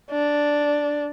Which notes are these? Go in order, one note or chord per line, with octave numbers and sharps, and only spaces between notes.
D4